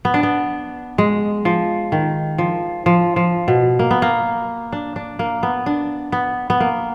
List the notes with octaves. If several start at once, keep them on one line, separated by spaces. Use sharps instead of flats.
B3
D4
B3
G#3
F3
D#3
F3
F3
F3
B2
A#3
B3
A#3
D4
D4
A#3
B3
D4
B3
B3
A#3